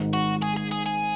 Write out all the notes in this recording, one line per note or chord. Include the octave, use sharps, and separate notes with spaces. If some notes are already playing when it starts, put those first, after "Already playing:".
Already playing: G#1 G#2 D#3
F#4
G#4
G#4
G#4
G#4